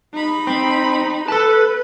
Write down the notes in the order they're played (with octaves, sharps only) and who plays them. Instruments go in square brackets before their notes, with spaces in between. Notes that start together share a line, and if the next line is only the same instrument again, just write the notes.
[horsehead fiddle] D#4 B5
[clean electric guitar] C4
[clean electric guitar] A4 A5 [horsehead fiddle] B4